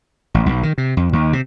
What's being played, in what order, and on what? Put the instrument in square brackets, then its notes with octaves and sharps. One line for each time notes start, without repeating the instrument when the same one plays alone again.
[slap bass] A1
B1
D#3
C3
F2
D#2
C3